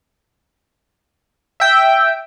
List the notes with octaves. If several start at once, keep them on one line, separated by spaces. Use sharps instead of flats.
E5 G5